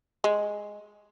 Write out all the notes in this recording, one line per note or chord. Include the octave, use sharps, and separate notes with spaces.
G#3